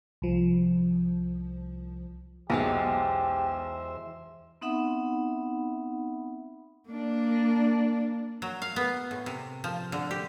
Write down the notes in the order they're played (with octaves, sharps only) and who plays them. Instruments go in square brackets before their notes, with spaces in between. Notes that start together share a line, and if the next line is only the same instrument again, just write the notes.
[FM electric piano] C2 F3
[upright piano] B1 [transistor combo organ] E2 C5 E5 [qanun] G#3 F#4 F5 [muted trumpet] G4
[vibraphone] B3 C4 D#4 E5 F#5 B5
[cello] A#3 D4
[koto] F#3
F5
B3
A2
C3
F3
D3
G4